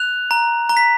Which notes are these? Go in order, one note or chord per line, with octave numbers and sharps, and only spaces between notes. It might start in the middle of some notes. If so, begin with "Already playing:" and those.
Already playing: F#6 F7
A#5
A#5
B6